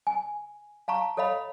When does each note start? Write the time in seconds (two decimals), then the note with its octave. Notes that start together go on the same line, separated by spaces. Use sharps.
0.07 G#5
0.88 F5 A5 A#5 C#6
1.17 A4 C#5 D#5 F5 B5